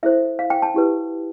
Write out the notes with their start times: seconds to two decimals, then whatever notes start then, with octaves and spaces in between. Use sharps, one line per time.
0.03 E4 A4 C5 E5
0.39 F5
0.50 G5
0.62 A5
0.74 E4 G4 B4